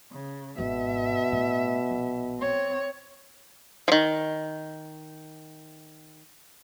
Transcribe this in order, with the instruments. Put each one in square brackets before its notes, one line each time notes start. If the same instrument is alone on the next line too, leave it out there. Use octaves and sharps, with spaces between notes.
[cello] C#3
[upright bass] G#1 G#2 [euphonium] B2 [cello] E5
[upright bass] A2
A#1
[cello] C4 C#5
[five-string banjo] D#3 F3